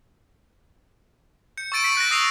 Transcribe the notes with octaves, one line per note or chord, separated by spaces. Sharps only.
G6 C#7
C#6 E6 A6 D7 D#7
B6 D7 F#7
F#6 A6 A#6
D#6 E6 A#6 C7 D#7 F7